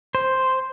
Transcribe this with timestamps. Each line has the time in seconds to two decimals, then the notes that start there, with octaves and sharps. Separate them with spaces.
0.15 C5